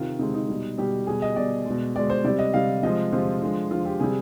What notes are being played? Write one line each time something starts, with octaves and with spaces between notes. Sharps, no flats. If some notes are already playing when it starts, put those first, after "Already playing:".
Already playing: C3 D#3 F4
C3 D#3 G#3 D#4
D#4
B2 G3
B2 G3 G4
B2 G3 G#4
D#5
B2 G3 D5
B2 G#3
B2 G#3 D5
C5
C3 G3 D5
D#5
C3 G3 F5
C3 F3 G#3 D#5
C3 F3 G#3 F4
D3 F3 G#3
D3 F3 G#3 F4
G4
C3 G3 G#4